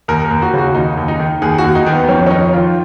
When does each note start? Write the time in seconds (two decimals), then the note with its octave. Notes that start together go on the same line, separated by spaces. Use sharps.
0.08 D#2 A#4
0.25 A#4
0.31 D#2
0.42 F#4
0.54 C#3 F#4
0.75 D#2 D#4
0.97 D#2
1.08 D#4
1.20 D#3
1.42 D#2 G#4
1.58 F#4
1.64 D#2
1.75 D#4
1.86 D#3
1.92 B3
2.08 F2 C#4
2.26 C#4
2.31 F2 D#4
2.53 D#3 F4